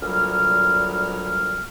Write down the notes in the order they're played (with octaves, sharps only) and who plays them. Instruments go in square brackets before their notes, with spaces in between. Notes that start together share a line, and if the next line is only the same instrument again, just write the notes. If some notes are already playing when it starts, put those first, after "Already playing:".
[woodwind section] D2 A#2 F#3 G3 F6